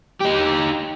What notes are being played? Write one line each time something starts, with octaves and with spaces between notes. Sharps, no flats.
D#4 G4